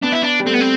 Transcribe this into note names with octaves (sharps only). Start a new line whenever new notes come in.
B3 D4
E4
D4
G3
A3 C4
B3
C4